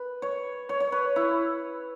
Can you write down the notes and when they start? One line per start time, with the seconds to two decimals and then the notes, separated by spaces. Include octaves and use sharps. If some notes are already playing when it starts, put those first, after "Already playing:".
Already playing: B4
0.22 C#5
0.69 C#5
0.80 C#5
0.92 B4
1.16 E4